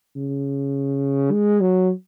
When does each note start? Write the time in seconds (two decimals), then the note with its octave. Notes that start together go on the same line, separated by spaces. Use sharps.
0.16 C#3
1.32 G#3
1.61 F#3